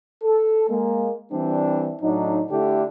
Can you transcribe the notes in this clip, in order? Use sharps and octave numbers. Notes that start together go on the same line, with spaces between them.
A4
G#3 A#3
E3 G3 C4 D4
A2 F#3 D4 D#4
D3 A3 D4 E4 G4